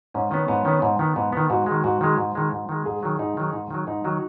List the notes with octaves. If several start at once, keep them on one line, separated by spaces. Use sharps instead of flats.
G#2 C#4
D#3 B3 C#4
G#2 B3
D#3 B3 C#4
G#2
D#3 B3
G#2 B3
D#3 B3
G#2 F#4
D#3 G#3
G#2 F#4
D#3 G#3
G#2
D#3 G#3
G#2
D#3 G#3
G#2 G#4
D#3 F#3
G#2 D#4
D#3 F#3
G#2
D#3 F#3
G#2 D#4
D#3 F#3 F#4